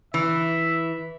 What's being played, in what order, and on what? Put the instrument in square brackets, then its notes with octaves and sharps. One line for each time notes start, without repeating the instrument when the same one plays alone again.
[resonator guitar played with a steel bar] E3 [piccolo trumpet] E5